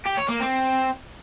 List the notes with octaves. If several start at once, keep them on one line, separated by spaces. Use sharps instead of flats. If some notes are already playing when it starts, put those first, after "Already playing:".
G4
C#5
A#3
C4